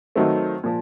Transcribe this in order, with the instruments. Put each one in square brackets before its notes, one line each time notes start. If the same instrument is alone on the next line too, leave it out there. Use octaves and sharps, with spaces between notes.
[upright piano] D#3 F#3 A3 C4
A#2 F3